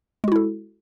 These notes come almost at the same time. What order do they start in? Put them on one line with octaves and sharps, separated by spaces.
G#3 F#4 E4 A4